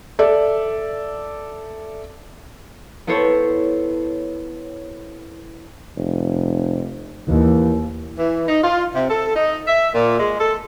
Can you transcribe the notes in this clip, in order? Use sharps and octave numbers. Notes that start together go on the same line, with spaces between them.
A4 D5 E5
B3 E4 A4 C5 C#5
F1
D#2 E3
E3
D#4
F4
C3
A4
D#4
E5
A#2
G#3
A4